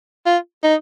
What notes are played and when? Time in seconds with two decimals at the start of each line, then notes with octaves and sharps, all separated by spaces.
0.26 F4
0.63 D#4